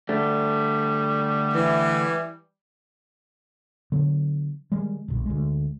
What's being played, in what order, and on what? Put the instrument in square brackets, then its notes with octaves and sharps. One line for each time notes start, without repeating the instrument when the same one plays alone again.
[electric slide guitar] D3 A3 [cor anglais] G3
[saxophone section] E3
[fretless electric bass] D3 F#3 B3
D#3 G3 G#3
D#1 B1
D2 G#3